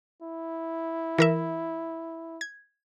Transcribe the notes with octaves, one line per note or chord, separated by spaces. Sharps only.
E4
E3 A#4 E5
G#6